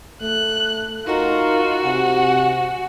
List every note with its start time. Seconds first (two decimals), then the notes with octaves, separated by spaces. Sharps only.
0.22 A3 F#6
1.07 D#4 F4 F#4 A#4 D#5 A#5
1.85 C3 F#5 G#5